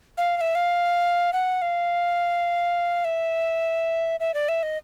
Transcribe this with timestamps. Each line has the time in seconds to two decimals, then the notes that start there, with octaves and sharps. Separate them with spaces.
0.18 F5
0.37 F5
0.41 E5
0.55 F5
1.33 F#5
1.62 F5
3.05 E5
4.20 E5
4.34 D5
4.49 E5
4.63 D#5